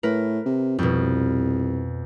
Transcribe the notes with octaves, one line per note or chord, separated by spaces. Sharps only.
A2 A#4 B4
C3
C2 F2 B2